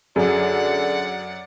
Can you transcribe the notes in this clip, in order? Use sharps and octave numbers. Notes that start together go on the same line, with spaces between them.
F#2 D3 G#4 D5 F#5